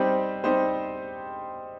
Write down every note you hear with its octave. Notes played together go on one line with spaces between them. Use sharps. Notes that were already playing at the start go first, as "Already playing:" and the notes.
Already playing: G3 C4 D#4 G4 C5
G3 C4 D#4 G4 C5